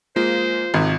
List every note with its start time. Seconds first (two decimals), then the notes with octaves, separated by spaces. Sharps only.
0.16 G#3 A#3 F4 C5
0.74 G#1 C3 D#3